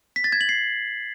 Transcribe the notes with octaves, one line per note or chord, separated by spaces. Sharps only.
B6
A6
G#6
F#7
C7